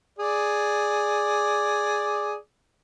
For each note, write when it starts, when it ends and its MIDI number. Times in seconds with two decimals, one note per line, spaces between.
0.19 2.35 68
0.19 2.35 74